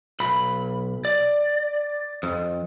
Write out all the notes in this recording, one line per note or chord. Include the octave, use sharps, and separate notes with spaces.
B1 B5
D5
F2